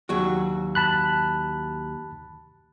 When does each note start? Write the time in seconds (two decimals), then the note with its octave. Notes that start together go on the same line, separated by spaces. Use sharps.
0.09 D#2 F#3 F#4
0.75 A5 B5 F#6